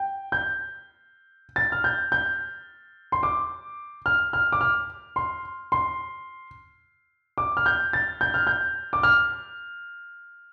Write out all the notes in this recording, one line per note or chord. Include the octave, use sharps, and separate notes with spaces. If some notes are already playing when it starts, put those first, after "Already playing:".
Already playing: G5
G6
A6
F6
G6
G6
C6
D6
F6
F6
D6
F6
C6
C6
D6
F6
G6
A6
G6
F6
G6
D6
F6